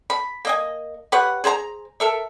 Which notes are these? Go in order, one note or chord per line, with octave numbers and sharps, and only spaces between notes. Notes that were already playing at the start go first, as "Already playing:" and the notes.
B5
A#3 D#5 G#5
G4 B4 C#5 F#5
G#4 C5 G5 A#5
A4 A#4 E5